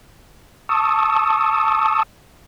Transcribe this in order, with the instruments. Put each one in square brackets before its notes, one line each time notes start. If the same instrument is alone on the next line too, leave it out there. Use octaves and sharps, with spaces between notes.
[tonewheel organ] A5 C#6 D#6 E6